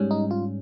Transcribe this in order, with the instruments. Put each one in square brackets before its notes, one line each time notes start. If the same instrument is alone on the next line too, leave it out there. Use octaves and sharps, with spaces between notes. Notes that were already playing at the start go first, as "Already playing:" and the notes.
Already playing: [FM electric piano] G#2 G3 C#4
D#4
F4